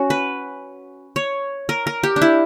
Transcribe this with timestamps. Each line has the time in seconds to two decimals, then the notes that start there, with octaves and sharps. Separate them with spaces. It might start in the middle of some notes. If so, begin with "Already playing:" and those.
Already playing: C#4 F#4
0.10 B4
1.16 C#5
1.69 A#4
1.87 A#4
2.03 G4
2.16 D4
2.22 E4